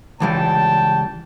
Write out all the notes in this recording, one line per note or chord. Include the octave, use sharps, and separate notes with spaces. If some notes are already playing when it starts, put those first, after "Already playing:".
C#2 E3 G3 G5 A5